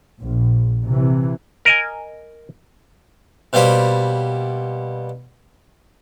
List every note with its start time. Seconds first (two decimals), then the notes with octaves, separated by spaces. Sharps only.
0.20 A#1
0.85 C3 E3
1.65 A#4 D#5 G#5
3.53 B2 G3 A#3 C5 B5